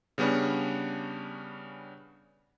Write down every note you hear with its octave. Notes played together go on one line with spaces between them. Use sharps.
C#3 G3 B3 C#4 D4